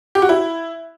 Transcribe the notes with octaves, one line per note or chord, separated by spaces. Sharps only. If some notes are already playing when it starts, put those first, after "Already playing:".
G4
F#4
E4